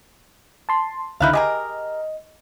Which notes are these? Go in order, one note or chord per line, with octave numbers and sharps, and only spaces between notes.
A5 C6
C#2 D3 D#4 E4 F5 F#6
G4 G#4 A#4 D#5